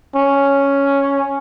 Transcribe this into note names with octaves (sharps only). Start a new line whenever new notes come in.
C#4